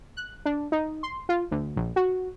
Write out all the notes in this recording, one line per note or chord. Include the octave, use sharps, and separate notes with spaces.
F#6
D4
D#4
C6
F4
D2
A#1
F#4